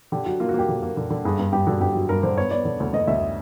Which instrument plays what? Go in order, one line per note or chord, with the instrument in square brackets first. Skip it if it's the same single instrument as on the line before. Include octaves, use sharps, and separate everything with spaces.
[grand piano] D3 G4
F#3 F#4
A#3 F4
F#4
A#3 G4
D3
A#3
D3
D3
G2 G#4
G2
G2 G4
D3 F#4
G2 G4
F#3
G2 A#4
D3 C5
B3 C#5
B3 D5
D3
D2
D2 D#5
D2 E5